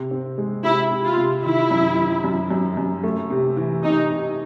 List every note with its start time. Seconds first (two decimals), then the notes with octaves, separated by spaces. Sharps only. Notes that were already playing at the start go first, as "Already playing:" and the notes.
Already playing: C3
0.11 C4
0.38 G#3
0.64 C3 E4
0.91 C3
1.04 F4
1.17 C3
1.44 D#3 E4
1.71 F#2
1.97 D#3
2.24 F#2
2.51 F#2
2.77 F#2
3.03 A3
3.30 C3
3.57 E3
3.83 C3 D#4
4.10 C3